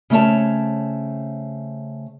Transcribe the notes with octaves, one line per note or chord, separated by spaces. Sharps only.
C#3 A3 C4 C#5 A5